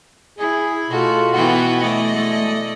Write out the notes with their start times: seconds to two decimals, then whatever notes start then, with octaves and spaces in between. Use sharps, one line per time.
0.39 E4 G#4
0.90 B2 A3 F4 F#4
1.34 E3 B3 F#4 G5
1.80 A3 D5 D#5
2.11 G#3 A4